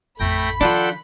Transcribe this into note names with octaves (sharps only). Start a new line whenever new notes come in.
A1 F2 A3 G5 B5 A#6
D#3 F3 D4 F4 A4 F#5 G5